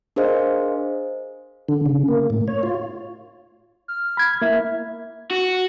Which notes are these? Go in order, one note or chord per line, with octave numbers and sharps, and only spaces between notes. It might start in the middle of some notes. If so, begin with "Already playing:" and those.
D4 G#4 A#4 C5 D#5 F5
D3
C#3
A#3
A2
C#5
F4
F6
B5 G#6
A#3 E4 E5
F#4